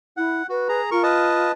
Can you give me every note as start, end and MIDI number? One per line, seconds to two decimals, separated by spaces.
0.17 0.42 64
0.17 0.47 78
0.49 0.68 66
0.49 0.80 71
0.69 0.90 68
0.69 0.90 82
0.91 1.50 65
0.91 1.03 70
0.91 1.03 85
1.03 1.52 71
1.03 1.52 75
1.03 1.52 81